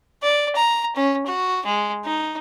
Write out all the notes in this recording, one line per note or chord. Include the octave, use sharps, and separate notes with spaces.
D5
A#5
C#4
F#4
G#3
D#4